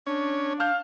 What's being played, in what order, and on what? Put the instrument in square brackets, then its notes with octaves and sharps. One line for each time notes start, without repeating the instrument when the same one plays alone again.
[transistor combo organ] C#4 C#5 [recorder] D4
[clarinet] F5 [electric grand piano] A5 F6 G6